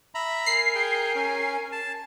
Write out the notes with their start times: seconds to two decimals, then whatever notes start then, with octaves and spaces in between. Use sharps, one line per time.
0.15 E5 A#5 B5
0.46 A#4 G#5 C7
0.75 G#4 G5
1.15 C#4
1.72 A5